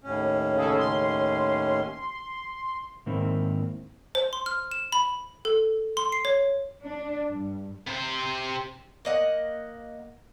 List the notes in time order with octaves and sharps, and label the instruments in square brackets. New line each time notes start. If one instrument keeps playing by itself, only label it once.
[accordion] D#2 A2 C#4
[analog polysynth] C#3 G#4 A4
C6
[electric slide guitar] G#2 D#3 A#3 C4 E4
[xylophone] C5
C6
F6
E7
B5
A4
C6
C7
C#5
[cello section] D4
G2
[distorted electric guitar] C3 C5
[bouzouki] A#3 D#5 F#5